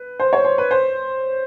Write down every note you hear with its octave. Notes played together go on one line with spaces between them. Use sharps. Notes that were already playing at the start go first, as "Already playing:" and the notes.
Already playing: B4
C5
C#5
C5
B4
C5